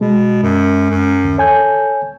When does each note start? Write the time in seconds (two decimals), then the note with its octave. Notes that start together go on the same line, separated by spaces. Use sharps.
0.01 B2 G#3
0.43 F#2
0.91 F#2
1.25 D#2
1.38 A4 C#5 G#5 G6